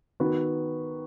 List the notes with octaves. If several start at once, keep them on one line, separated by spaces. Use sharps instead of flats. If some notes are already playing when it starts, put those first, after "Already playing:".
D#3 B3 F#4 B4